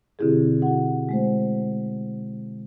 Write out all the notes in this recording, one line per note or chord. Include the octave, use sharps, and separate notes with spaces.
B2 D3 C4 E4 G4 G#4
F#4 F#5
G#3 A3 C5